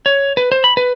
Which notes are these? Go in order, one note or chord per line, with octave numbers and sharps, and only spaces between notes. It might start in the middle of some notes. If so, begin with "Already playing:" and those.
C#5
B4
C5
B5
B4